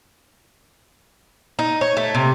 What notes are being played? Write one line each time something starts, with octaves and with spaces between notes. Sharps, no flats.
D#4
C#5
A3
C3